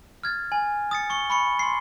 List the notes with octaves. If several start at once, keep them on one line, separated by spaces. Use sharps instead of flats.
F6 G#6 A6
G#5
D#6 A6 C#7
C#6 C#7 G7
B5 C#6 C#7
C6 C7